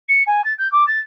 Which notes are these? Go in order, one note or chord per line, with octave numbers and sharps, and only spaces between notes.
C#7
G#5
A6
G6
D6
A6